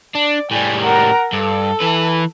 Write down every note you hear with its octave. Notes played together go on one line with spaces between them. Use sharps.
D4 D5
A2 G3 G4 G#5
A#4 F#5
G2 A4
E3 B4